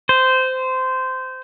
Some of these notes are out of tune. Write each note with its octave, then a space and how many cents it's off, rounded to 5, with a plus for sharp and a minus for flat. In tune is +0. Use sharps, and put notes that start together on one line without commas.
C5 -15